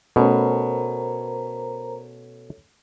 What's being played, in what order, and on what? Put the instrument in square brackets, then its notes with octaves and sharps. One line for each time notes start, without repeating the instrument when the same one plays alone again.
[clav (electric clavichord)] B2 [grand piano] A3 C#4 [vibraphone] A#4 C5 A#5